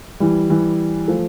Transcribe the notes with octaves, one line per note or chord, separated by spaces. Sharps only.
E3 G3
E3 G3
F3 A3